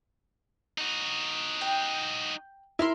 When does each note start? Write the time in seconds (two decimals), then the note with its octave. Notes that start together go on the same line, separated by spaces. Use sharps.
0.78 D#4 F#4
1.61 G5
2.79 E4 A#4 E5 C6